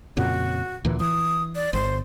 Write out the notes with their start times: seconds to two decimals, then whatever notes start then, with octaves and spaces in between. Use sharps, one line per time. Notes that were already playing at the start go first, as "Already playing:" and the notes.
0.17 F2 A#2 C#3 F#4
0.85 D2 A#2 E3
1.00 E3 D#6
1.55 D5
1.73 G1 C5